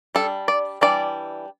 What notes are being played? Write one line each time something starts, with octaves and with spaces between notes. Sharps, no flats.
G3 D4 A4
D5
E3 G3 D4 D5